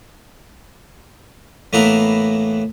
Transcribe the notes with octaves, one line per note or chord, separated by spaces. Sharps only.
A2 E3 A#3 B3 E4 A#5